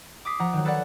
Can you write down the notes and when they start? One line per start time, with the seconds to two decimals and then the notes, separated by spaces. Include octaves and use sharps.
0.25 D6 D#6 B6 C7
0.39 F3 F#5 A#5
0.53 D#3 F#3
0.65 A4 B4 C#5 D5 F5 F#5